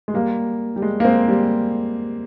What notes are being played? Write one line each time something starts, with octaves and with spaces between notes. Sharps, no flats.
G#3
G3 A#3
G3
G#3
A#3
G#3 C4
G3